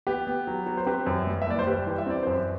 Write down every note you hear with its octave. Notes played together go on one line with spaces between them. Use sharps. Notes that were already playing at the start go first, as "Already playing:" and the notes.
B3 G4 B4
B3
F#3
F#3
C5
C4 G4 B4
F#2
G3
E5
F#1 D5
C5
G3 G4 B4
E3
E5
C4 D5
F#2 C5
B4